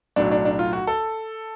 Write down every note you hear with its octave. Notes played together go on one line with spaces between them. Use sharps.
B1 A2 F#3 D4
D4
D4
F4
F#4
A4